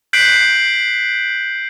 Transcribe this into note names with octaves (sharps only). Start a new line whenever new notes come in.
F#6 G6 B6 C7 D7 F#7